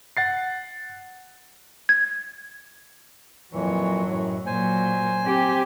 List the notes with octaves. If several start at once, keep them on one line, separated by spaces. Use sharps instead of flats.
F#5 A6 C7
G#6
F2 A#2 E3 F#3 C#5
F#2 A2
A#2 F#3 C5 G#5
C4 G4